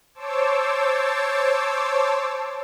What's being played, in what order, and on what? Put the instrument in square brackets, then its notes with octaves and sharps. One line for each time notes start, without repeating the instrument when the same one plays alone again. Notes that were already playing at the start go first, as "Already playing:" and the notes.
[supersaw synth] C5 C#5 A5 D6 E6